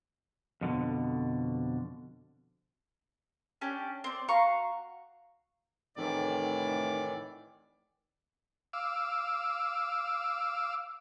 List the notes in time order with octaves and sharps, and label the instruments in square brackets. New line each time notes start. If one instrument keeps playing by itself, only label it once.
[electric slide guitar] F2 B2 D3
[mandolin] C#4 D4 G4
C4 D5
F#4 F5 A#5 C#6
[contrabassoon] F1 [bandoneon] A2 D#3 E3 [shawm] D5
[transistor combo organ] F5 D6 E6